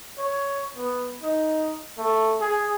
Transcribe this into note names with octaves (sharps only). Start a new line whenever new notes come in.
C#5
B3
D#4
A3
G#4